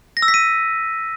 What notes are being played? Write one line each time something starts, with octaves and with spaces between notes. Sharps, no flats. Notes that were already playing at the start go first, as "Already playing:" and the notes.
A#6
E6
B6
D#7